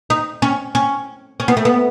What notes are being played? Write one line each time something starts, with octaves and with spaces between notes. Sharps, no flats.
D#4
C#4
C#4
C#4
B3
A3
B3